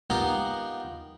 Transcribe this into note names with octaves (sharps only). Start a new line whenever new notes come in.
B3 D#4 F4 G4 A#4